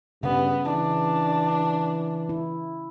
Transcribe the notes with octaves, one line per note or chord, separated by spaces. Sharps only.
G2 C#3 B3
E3 D4
E4